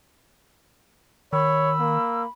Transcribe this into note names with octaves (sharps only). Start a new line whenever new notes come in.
D#3 C#5 B5 E6
A#3